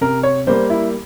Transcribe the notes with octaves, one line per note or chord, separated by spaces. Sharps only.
C3 A#4
C#5
G3 A#3 C5
E4